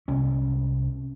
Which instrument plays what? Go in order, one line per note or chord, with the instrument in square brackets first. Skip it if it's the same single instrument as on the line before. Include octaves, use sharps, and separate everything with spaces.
[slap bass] C2 C#4